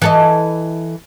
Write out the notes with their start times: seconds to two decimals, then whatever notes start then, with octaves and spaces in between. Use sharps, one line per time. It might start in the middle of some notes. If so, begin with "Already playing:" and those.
0.02 E3 A4 D#5